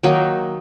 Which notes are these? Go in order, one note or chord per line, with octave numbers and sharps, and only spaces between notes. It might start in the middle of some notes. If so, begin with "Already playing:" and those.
D#3 F#3 A#3 D#4